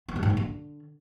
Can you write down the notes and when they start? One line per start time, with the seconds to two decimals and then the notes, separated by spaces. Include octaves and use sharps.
0.08 B3
0.16 C#3
0.23 G#2
0.30 A#3
0.37 D3